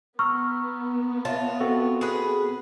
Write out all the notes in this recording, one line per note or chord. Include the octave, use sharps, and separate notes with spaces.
B3 A#5 C#6 E6 F6
F4 C#5 E5 A5
C4 F#4 A4
G#4 B4